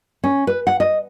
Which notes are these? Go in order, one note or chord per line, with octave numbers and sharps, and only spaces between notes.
C#4
B4
F#5
D#5